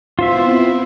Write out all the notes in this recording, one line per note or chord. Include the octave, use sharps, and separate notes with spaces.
B3 C4 E4 F4 C5 E5